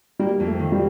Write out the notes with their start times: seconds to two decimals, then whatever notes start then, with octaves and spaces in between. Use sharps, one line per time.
0.19 G3 A#3
0.40 F2
0.47 A3
0.59 D#3
0.72 G3